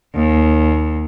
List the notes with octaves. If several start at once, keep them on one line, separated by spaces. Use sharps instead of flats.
D#2